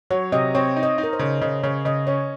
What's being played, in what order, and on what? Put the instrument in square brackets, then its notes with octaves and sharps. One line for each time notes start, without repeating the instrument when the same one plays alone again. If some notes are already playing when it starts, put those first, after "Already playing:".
[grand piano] F#3 [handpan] C#5
[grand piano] C3 [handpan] D#5
[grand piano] C4 [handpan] C#5
[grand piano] D#4
[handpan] D#5
[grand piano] D#4
[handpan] A#4
C5
[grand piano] C#3
[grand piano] C#3 [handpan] D#5
[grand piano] C#3 [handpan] C#5
[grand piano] C#3 [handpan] D#5
[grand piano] C#4 [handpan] C#5